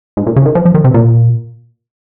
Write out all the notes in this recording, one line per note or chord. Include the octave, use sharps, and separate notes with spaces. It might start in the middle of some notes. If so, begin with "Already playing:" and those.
G#2
A#2
C#3
D#3
F3
F3
D#3
C3
A#2